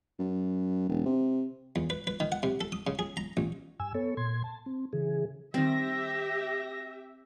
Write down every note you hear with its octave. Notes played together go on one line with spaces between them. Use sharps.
F#2
E1
C3
E2
B4
B4
D#3
F#5
C3
A4
D#6
C#3
G#4
A#5
A1
G2 G#5 E6
B3 A4 C#5
A#2 C6 G#6
A5
C4
C#3 E3 G#4
D#3 G3 C4 G4 E5 A#6